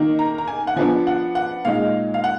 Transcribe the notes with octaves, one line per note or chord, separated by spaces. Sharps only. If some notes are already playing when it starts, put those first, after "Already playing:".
Already playing: D#3 A#3 D#4
A#5
A#5
G#5
F#5
F3 B3 D4 G#5
F#5
F#5
A#2 G#3 D#4 F5
F5
F#5